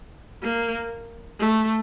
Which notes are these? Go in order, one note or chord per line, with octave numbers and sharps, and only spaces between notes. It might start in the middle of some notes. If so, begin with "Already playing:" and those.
A#3
A3